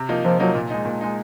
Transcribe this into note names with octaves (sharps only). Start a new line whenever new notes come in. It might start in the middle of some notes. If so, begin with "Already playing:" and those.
Already playing: C3
F3 A#3 D#4
C3 F3
F3 F#3 A#3 D#4
A#2
G#3 D#4
A#2
G#3 D#4